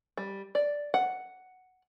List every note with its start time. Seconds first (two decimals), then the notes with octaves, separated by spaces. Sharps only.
0.17 G3
0.55 D5
0.94 F#5